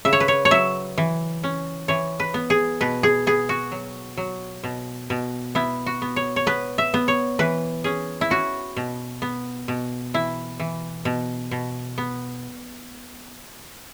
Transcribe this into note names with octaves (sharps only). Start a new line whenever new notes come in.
C#3 E5
C#5
B4
C#5
C#5
F#3 E5
E3
C#4
E3 C#5
B4
B3
G#4
B2 B4
G#4
B3 G#4
F#4
F#3
F#3
B2
B2
B3 E4
F#4
B3
C#5
C#5
B3 B4
E5
B3
C#5
E3 B4
C#4 G#4
E4
C#4 F#4
B2
B3
B2
E3 E4
E3
B2
B2
B3